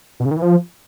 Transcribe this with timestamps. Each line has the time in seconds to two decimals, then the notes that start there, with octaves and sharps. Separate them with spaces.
0.20 B2
0.25 C#3
0.31 D#3
0.37 E3
0.42 F3